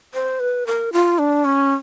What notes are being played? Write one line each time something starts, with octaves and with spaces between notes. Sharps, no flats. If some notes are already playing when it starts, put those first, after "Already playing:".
C5
B4
A#4
F4
D4
C#4